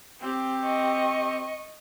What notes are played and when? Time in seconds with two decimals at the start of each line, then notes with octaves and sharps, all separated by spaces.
0.20 C4 G4
0.65 D#5 C#6